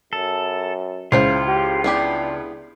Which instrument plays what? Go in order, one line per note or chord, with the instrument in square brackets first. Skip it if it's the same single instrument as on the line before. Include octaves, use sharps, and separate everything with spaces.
[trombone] F#2 [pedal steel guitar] A4
[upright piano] C#2 [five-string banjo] E4 C5 G5 [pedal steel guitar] F4
[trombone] G4
[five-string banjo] B3 E4 G4 [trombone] D4